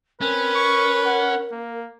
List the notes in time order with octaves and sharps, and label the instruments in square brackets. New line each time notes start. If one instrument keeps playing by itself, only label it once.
[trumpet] C4 [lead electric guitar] C#4 [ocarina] A#4 [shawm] B4
[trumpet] C#6
F#5
A#3